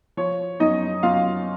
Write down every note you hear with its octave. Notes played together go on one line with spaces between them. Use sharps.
F3 C#5
F#2 D#4 D#5
F#2 F4 F5